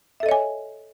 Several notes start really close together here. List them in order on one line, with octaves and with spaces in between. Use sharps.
E5 A4 D#5 C#5 G#5